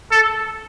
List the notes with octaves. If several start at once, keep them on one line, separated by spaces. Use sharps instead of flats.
A4